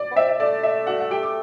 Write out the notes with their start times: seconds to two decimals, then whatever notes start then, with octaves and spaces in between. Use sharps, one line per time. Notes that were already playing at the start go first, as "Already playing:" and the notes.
Already playing: D5
0.11 B3
0.16 C4 E5
0.29 E5
0.40 A3 D5
0.63 E5
0.87 F#4 F#5
1.00 F#5
1.11 G4 G5
1.23 D6